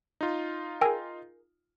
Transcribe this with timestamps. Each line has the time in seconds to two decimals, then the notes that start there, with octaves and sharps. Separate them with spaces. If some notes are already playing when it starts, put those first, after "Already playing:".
0.21 D#4 F4
0.81 G#4 A#4 G5 G#5 E6